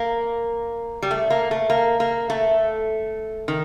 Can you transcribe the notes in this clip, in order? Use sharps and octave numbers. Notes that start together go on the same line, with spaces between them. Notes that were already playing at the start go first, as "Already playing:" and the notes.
Already playing: A#3
G3
A3
A#3
A3
A#3
A#3
A3
D#3